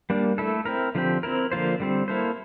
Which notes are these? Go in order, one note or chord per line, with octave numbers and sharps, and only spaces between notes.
G3 A#3 D4
A3 E4 A4
C4 E4 A#4
D3 F3 C4 G4
C4 E4 A#4
D3 F3 A#3 F4 C5
D3 G3 C4
A#3 E4 A4 C5